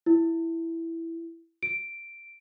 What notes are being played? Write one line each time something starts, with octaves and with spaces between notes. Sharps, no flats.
E4
D7